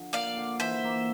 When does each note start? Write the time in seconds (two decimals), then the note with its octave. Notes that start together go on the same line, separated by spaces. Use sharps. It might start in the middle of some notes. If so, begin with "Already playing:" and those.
Already playing: D3 F3
0.13 A#3 D5 F5
0.37 D3
0.60 E3 C5 E5
0.84 A#3